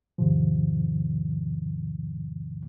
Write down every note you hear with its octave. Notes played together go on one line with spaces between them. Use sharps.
E2 G#2 C3 D#3 F3